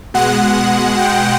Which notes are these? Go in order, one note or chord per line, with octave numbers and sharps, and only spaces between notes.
B2 G#3 F#5
G5